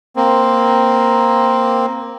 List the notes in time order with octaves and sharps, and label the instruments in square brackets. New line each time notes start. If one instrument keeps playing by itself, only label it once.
[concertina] A#3 C4